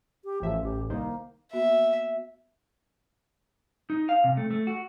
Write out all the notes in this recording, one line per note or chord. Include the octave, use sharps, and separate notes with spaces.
G4
A1 F3 E5
A1 G4
C2 D#3 A#3 C5
A#3 B3 F#4 E5
D#4
F5
C3
A3
A3
F#4